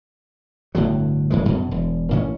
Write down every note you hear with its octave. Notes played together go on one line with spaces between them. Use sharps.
G1 A2 D3 F#3
F#2 E3 G#3
F#2 B2
E1
A1 A#2 C#4